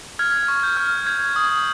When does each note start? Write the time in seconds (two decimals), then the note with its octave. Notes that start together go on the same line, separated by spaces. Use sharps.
0.19 F6 G#6
0.48 C#6
0.63 G6
0.77 F6
1.07 G6 G#6
1.36 D#6